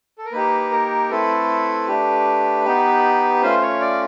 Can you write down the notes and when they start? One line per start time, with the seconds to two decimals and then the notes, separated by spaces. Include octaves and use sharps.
0.18 A4
0.25 A#4
0.32 A#3 D#4 G4 B4
0.72 A#4
1.10 A3 C4 E4 A4 B4
1.87 A3 D4 G4
2.65 B3 D#4 G4
3.42 A3 C#4 F4 C5
3.62 C#5
3.81 D5